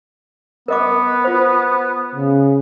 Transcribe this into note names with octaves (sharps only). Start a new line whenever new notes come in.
B3 A#4 D#5 D6
F4 C5
C#3